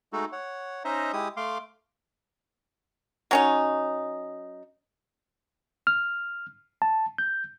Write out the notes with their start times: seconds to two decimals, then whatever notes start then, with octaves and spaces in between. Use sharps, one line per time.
0.13 G#3 A3 D#4 F#4 A4
0.32 C#5 F#5
0.85 C#4 D#4 C5 D#5 E5 A#5
1.13 G#3 E4 G4 D#6
1.37 A3 F5 C6 D6
3.31 F#3 C#4 D#4
5.87 F6
6.82 A5
7.18 G6